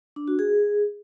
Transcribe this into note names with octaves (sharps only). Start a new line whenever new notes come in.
D4
F#4
G#4